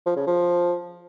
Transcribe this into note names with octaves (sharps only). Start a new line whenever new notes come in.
F3
C#3
F3